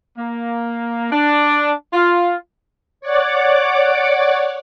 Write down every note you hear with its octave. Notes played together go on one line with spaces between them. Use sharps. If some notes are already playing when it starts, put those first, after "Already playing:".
A#3
D4
F4
C#5 D5 F#5 D6